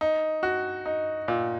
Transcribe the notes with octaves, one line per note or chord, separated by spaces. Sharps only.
D#4
F#4
D#4
A#2